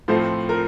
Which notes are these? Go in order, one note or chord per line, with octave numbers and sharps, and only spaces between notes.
A2 F3 A3 C4 C5
A#4